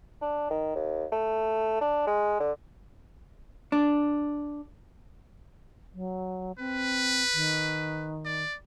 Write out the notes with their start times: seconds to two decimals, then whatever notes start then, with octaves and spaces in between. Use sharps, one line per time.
0.21 D4
0.50 D#3
0.75 D#2
1.12 A3
1.81 D4
2.07 G#3
2.40 D3
3.72 D4
5.93 F#3
6.58 C4 B4
7.33 D#3
8.25 D5